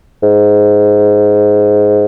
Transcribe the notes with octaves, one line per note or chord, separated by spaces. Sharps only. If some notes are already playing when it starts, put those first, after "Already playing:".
G#2